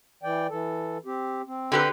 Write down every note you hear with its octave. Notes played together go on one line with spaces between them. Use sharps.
E3 D5 G5
E3 A4
C4 G4
C4
D3 G4 B4